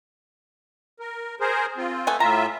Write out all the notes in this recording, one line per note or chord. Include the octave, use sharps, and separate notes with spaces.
A#4
G#4 A#4 C5
C4 F4
A3 B3 G#5
A2 F4 E5 A#5